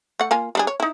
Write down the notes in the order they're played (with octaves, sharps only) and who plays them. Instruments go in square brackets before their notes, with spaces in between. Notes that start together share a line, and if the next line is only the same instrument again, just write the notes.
[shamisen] A3 F#5
A#3 F4 G#5
G3 D4 G#4
C#5
D#4 E4